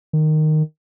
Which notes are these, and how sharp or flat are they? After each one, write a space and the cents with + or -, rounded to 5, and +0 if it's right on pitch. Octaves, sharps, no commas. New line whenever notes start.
D#3 -10